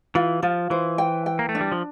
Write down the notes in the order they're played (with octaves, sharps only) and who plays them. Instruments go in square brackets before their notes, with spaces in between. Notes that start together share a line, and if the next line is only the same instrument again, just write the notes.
[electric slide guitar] E3 [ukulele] F4
[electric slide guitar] F3 [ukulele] F4
[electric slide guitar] E3 [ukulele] C5
[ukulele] G5
G5
[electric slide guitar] A#3
A3
[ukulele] D4
[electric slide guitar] G3
F3